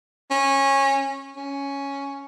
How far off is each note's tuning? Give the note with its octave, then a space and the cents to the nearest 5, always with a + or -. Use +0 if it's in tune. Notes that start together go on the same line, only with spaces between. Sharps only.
C#4 -20
C#4 +5